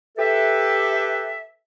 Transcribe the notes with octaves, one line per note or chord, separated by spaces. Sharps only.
G4 A4 B4 E5